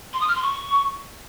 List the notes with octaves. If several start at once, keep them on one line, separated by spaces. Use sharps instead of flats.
C6
D#6
F6
C6
C#6